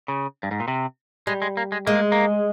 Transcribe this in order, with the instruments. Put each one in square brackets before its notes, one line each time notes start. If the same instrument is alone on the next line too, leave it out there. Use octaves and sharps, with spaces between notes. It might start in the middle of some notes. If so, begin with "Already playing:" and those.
[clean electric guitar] C#3
G2
G#2
A#2
C3
[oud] G3 [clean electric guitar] G#3
[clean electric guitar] G#3
A#3
G#3
[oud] G#3 [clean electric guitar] A#3
[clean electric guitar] A#3